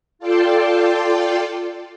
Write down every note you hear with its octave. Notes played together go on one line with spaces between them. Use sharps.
F4 A4 D5 G5 A5 C6